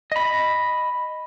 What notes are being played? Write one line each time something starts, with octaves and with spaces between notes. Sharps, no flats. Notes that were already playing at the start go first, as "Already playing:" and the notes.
D#5 B5